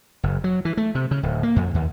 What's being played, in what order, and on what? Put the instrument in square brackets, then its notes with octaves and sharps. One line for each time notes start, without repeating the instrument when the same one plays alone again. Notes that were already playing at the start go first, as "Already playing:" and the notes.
[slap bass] F#1
F#3
E3
A3
C3
C#3
D1
A#3
F2
D#2